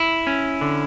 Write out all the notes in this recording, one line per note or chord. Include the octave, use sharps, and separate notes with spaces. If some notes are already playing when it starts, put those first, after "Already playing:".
Already playing: E4
C#4
D3